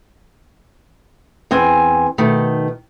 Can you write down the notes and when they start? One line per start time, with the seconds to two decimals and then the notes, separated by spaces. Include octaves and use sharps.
1.51 E2 C4 G#5
2.18 B2 D#3 A3